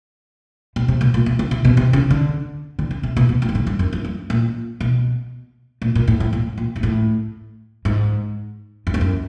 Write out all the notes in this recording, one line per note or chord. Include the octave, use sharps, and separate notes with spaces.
B2
C3
B2
A#2
B2
C#3
C3
B2
C3
C#3
D3
D3
C#3
C3
B2
B2
A#2
G#2
A2
G2
F#2
F#2
G2
A#2
B2
A#2
A#2
A2
A2
A#2
A#2
G#2
A2
G#2
F#2
F2
F#2